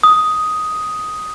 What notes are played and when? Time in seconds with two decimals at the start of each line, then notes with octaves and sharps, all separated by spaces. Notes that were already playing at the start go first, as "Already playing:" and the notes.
0.03 D#6